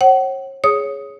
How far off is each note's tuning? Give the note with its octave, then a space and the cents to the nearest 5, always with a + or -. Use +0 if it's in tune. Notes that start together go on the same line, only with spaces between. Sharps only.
C#5 -40 F#5 +35
G#4 +0 C#5 +0 D#6 +5